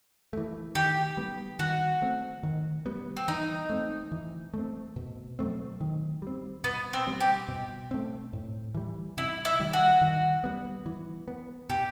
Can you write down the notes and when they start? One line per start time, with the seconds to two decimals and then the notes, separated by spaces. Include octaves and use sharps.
0.33 E3 A3
0.75 D#3 G4
1.17 G3 B3
1.59 D#3 F#4
2.02 A3 C4
2.43 D#3
2.86 G3 B3
3.17 C4
3.28 E3 D#4
3.70 A3 C4
4.12 E3
4.54 A3 C4
4.96 B2
5.39 F#3 A3 C4
5.81 D#3
6.22 G3 C4
6.64 B2 B3
6.93 C4
7.07 G3 C4
7.20 G4
7.49 B2
7.91 A3 C4
8.33 A2
8.75 E3 G3
9.17 C3 E4
9.45 E4
9.60 D#3 G3
9.73 F#4
10.01 D#3
10.44 G3 B3
10.86 E3
11.28 B3
11.70 B2 G4